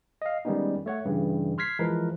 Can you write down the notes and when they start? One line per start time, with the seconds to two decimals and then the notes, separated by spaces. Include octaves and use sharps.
0.22 D#5 F5
0.45 D#3 G3 G#3 B3 C#4 D#4
0.86 A3 C#5 F#5
1.05 G2 C#3 E3
1.58 C6 F6 G#6 B6 C7
1.79 E3 F3 G#3 A#4 B4